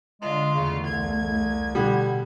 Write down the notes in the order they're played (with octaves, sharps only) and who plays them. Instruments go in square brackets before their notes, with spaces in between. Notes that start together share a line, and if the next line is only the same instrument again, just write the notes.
[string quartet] D3 F4 [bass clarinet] G#3
[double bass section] E2 A3 [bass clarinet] C#3
[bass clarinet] C2 [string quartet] G#6
[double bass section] B2 [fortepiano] D3 G3 [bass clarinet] B3